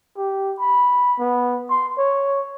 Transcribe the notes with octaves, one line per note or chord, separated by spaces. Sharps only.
G4
B5
B3
C6
C#5